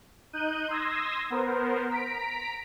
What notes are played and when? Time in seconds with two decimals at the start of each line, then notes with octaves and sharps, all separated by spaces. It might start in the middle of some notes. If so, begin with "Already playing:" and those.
0.33 D#4 F#6 G6 D#7
0.68 C6 D#6 E6 G#6 A#6
1.30 B3 A#4 C5
1.89 A#5 B6 D7